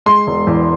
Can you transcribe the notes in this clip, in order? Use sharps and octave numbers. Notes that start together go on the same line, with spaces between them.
G#3 C6
E1
E2